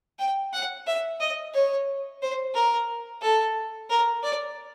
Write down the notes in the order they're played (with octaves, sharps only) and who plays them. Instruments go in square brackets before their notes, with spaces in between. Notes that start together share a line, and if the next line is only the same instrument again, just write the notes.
[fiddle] G5
F#5
E5
D#5
C#5
C5
A#4
A4
A#4
D5